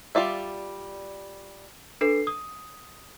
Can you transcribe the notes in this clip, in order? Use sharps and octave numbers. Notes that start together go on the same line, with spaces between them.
G3 F4 D5 E5
D4 A4 B4 C7
D#6